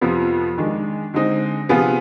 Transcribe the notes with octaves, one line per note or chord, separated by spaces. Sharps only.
F2 C3 F3 B3
D#3 G#3 D4
D3 G#3 C4 D#4
C3 F3 B3 F4 G#4